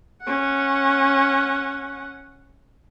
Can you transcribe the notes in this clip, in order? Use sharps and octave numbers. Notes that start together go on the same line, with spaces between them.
C#4 F#5